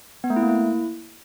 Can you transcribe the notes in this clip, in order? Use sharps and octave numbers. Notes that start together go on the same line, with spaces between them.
B3
A3
E4
A#3
E4